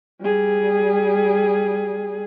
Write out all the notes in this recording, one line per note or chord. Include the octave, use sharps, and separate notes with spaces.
G3 G#4